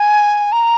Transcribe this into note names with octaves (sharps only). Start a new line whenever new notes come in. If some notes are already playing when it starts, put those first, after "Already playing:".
Already playing: G#5
A#5